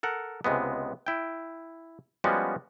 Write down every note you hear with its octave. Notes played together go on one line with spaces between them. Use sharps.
A4 A#4 F#5
C#2 C3 G#3 B3
E4 G5
F3 G3 G#3 B3 C#4 F#4